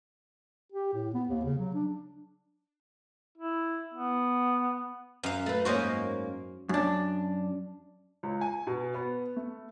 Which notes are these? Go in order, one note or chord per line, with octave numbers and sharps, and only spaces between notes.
G4
A2
B3
D#2
C#3
F#3
D4
E4
B3
F#2 F5
A3 B4
G#2 A#3 C#4 F#4 C5 D#5
F#2 D4
C#2
G#5
B2
B3
A3